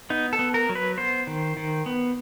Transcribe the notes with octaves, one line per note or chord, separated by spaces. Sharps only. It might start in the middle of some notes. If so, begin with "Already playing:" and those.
B3 D#4
A4
B3
A#4
F#3
B4
B3 C5
D#3
D#3
B3